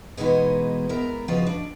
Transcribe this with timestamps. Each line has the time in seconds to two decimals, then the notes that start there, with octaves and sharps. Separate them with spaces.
0.17 B2 E3 G#3 B3 D#4 F#4
0.89 G#3 B3 A#4 E5 A#5
1.28 C#3 F3 F4 F#4 B4 D#5
1.47 D4